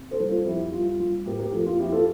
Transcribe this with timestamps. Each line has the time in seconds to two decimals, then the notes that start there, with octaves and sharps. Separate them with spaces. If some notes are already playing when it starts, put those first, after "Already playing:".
Already playing: C3
0.11 A4 C5
0.20 G3
0.28 F4 A4
0.46 F2 E4 G4
0.73 G3 F4
1.00 G3 F4
1.26 A2 G4 A#4
1.39 G4 A#4
1.52 F2 F4 A4
1.66 F4
1.79 F2 E4 G4
1.92 F4 A4